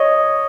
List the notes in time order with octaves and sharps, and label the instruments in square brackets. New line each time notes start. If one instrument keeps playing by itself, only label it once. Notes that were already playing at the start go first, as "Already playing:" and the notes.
Already playing: [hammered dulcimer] C#5 D#5